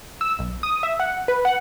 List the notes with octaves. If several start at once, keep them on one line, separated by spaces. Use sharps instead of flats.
E6
B1
D#6
E5
F#5
B4
F#5